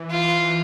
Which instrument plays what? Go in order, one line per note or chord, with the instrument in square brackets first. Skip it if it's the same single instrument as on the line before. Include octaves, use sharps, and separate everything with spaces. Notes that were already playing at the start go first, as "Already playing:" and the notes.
Already playing: [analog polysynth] E3
[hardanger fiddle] F4